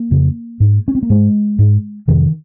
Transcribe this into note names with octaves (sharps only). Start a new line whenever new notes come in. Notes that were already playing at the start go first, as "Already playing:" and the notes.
Already playing: A#3
F2 C#3
G#2
C#4
C4
A#3
G#2 G#3
G#2
F2 C3 D#3